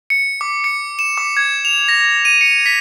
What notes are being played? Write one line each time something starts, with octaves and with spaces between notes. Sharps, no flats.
C#7
D6
C#7
E7
D6
G#6
F7
A#6
D#7
C#7
B6